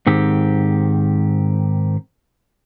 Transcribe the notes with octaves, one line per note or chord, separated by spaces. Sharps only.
G#2 D#3 C4 G4